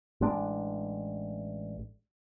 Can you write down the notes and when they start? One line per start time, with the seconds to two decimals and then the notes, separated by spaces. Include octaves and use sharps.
0.21 A1 G#3 D4